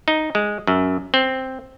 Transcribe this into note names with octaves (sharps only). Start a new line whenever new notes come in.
D#4
G#3
F#2
C4